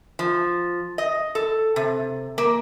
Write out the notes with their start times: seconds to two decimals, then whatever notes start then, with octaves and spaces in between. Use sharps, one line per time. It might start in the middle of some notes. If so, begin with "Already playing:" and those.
0.19 F3
0.98 D#5
1.35 A4
1.76 C3
2.38 A#3